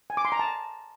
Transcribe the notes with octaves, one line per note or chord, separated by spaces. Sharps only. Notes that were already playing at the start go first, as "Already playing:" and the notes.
G#5
D6
C6
A#5
A5